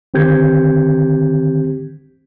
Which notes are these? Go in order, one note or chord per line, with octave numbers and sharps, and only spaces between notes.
D3 D#3 C4 G4 G6 G#6